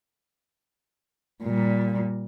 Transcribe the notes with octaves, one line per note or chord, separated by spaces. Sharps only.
A#2 G3